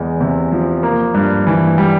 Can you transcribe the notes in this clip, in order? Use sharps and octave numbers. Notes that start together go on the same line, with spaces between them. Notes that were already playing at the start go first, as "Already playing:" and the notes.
Already playing: E2 G#3
C3
F3
A#3
G2
E3
G3